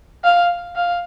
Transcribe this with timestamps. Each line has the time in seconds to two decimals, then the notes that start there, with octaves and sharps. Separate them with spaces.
0.24 F5
0.76 F5